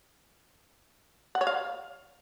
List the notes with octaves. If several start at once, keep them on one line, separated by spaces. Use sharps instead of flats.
F#5
C#5
F5